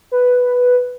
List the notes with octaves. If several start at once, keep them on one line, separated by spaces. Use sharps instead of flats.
B4